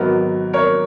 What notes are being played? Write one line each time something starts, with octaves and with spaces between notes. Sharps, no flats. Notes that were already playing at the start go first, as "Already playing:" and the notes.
Already playing: G#1 G#2 F#3 B3 A#4
A#4 C#5